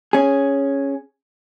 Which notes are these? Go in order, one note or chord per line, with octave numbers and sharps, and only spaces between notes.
C#4 G#4